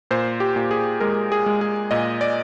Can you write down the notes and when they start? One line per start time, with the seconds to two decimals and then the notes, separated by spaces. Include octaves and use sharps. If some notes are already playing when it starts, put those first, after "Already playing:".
0.11 A#2 C5
0.40 G4
0.56 A#2
0.71 G#4
1.00 G#3 A#4
1.32 G#4
1.46 G#3
1.61 G#4
1.91 A#2 D#5
2.21 D5